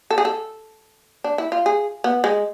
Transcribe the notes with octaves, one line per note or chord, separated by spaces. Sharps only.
A4
G#4
A4
D4
E4
F4
G#4
B3
G#3